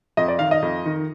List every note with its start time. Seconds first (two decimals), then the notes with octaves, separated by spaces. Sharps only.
0.17 F2 D#5
0.28 D5
0.39 D#3 F5
0.51 D#5
0.62 F2
0.86 D#3